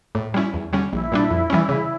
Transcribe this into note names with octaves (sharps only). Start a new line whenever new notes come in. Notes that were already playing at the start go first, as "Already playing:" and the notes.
A2
G3 C#4 E4
E2
D3 G3 C#4
A#1 E4
A#2 G3 D4
F2
E3 G3 C#4
C#3